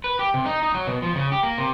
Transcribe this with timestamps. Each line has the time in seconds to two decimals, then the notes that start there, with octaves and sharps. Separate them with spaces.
0.04 B4
0.19 G4
0.34 C3
0.46 D#4
0.63 D#4
0.75 F#3
0.87 B2
1.02 F3
1.15 C#3
1.32 G4
1.43 A#3
1.58 C3